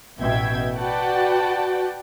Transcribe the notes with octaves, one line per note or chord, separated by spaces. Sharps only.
A1 B2 E5 G5 G#6
F#4 B4 D5 F#5 G5 A5